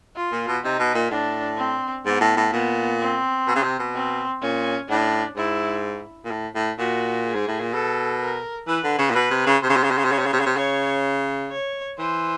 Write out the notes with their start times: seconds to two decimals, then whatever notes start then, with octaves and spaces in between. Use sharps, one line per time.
0.16 F4
0.32 A#2
0.48 B2
0.64 C3 D#4
0.79 B2
0.95 A#2
1.10 A2 D4
1.58 C4
2.06 G#2 B3
2.20 A2
2.37 A2
2.52 A#2 B3
3.00 C4
3.47 B2
3.55 C#3
3.63 C3
3.79 B2
3.94 C4
4.42 A#2 C#4
4.89 A2 D4
5.36 G#2 E4
6.24 A#2
6.31 A2
6.55 A2
6.78 A#2 F#4
7.26 G#4
7.34 G#2
7.47 A2
7.60 A#2
7.73 B2 A4
8.21 A#4
8.67 E3 B4
8.84 D3
8.99 C#3
9.11 A#2
9.15 B2 B4
9.31 C3
9.46 C#3
9.62 C3 C5
9.69 C#3
9.76 C3
9.83 C#3
9.91 C3
9.98 C#3
10.05 C3
10.09 C#3 C#5
10.19 C3
10.26 C#3
10.33 C3
10.40 C#3
10.46 C3
10.56 C#3 C#5
11.51 C#5
11.99 E3 C5